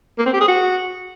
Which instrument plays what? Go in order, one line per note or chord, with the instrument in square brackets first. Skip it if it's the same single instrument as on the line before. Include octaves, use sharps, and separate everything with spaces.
[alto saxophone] A#3
C4
G4
G#4
F#4